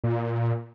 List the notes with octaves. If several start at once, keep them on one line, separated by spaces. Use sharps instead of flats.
A#2